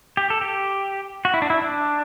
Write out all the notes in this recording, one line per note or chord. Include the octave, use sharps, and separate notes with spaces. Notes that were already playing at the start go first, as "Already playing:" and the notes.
G4
A4
G4
F#4
E4
D4
E4
D4